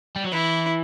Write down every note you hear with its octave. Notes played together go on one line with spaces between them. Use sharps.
G3
F#3
E3 E4